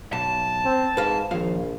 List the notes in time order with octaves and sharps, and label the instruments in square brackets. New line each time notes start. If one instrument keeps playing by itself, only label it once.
[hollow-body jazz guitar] B1 [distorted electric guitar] A5
[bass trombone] C4
[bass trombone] G#2 [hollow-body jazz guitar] B4 F5
[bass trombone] A#1 [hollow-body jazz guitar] D#2 F3 F5